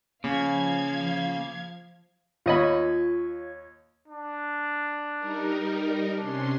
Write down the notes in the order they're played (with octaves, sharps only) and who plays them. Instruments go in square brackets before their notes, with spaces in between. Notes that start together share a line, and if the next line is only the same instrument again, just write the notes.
[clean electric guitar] C#3 [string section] F3 F5 G#6 [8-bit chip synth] A#3
[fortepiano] D#2 D#5 B5 [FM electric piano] F4 C#5 G#6
[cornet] D4
[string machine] G3 D#4 A#4
[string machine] C3 C#4 C6 [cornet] D4